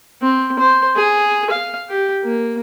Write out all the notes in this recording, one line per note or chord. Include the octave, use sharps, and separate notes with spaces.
C4
C5
G#4
F5
G4
A#3